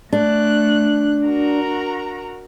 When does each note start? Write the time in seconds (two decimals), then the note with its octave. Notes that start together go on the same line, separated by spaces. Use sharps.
0.13 A3 D4 F#6
1.26 F#4 A#4 A#5